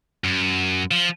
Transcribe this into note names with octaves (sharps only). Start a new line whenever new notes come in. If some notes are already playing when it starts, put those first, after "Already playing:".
F#2
F3